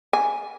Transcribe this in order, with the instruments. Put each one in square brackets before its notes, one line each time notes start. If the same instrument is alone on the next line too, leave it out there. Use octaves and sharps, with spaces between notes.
[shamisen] G#5